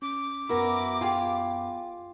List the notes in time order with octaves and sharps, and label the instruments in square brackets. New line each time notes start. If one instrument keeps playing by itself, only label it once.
[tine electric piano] C#4 [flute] D6
[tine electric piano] F#2 B3 B5 [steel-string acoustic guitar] E4 F#4 A#4
[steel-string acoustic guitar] F4 [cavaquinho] G4 G#4 G#5